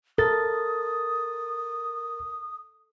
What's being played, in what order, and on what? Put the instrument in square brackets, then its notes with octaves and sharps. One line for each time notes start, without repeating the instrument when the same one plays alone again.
[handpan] A4 [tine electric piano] A#4 A6 [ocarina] D#6